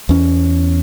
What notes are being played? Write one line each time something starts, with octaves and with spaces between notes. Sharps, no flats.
E2 C#4